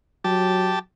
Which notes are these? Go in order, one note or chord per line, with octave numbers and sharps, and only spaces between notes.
F#3 G4 A5